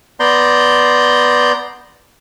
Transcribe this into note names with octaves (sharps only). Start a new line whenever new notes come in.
B3 D5 A#5 C6 G6